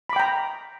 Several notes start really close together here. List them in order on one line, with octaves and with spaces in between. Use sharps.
B5 D6 G5 A#5